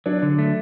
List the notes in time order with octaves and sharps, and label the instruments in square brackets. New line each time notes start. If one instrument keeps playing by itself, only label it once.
[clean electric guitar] F#3 [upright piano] D4
[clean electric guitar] D3
A3